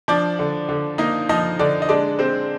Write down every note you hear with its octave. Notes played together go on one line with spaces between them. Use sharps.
F3 D4 D5
D3
D3
A#3 D#4 D#5
F3 D#4 D#5
D3 D4 D5
D#5
G#3 D4 D5
G#3 C4 C5